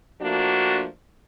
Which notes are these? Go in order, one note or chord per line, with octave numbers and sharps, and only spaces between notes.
F3 A3 A#3 D4 F#4